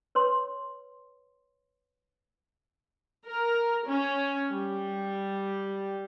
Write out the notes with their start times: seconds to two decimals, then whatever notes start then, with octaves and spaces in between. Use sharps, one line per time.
0.15 B4 C#5 C6
3.25 A#4
3.85 C#4
4.51 G3